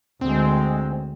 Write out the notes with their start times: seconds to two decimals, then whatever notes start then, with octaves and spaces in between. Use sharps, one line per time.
0.21 D2 G#3 C4